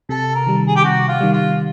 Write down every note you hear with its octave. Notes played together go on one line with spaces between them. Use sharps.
C3 A4
A#4
D#3 G3
G#4
G4
C3 F#4
F4
D#3 G3
F4